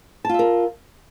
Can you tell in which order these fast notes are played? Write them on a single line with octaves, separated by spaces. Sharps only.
A5 F4 E5 A#4